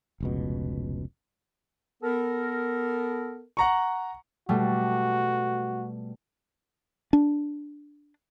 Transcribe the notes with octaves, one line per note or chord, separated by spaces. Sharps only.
F1 C#2 B2
B3 A4 A#4
F#5 A#5 C#6
B2 G3 A3 F#4
D4